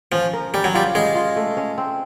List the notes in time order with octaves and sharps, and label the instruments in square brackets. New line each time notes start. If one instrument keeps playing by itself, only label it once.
[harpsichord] F3 [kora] C#4
[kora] A#4
[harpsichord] G3 [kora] C#4
[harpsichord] F#3
[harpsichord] G3 [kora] F4
[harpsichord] G#3 [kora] C#4
[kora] F4
A3
C#4
C4